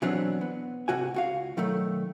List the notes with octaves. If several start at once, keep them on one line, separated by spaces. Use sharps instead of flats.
B2 E3 F#3 B3 C4 D4
B3
G#2 C3 F#4 G#5
C#2 F#4 F5
B2 D#3 F#3 A3